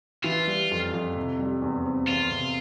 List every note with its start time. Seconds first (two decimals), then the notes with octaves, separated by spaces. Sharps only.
0.24 E3 F4
0.47 G3
0.71 F2
0.93 F2
1.16 C3
1.39 G3
1.62 E2
1.85 C4
2.08 E2 F4
2.31 C3